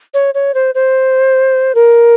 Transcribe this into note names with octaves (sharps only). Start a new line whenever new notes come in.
C#5
C#5
C5
C5
A#4